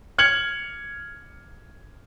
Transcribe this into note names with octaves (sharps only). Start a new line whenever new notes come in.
F6 G#6 C#7 F#7